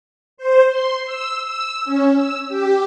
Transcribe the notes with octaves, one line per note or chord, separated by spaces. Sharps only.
C5
C6
E6
E6
C#4
E6
G4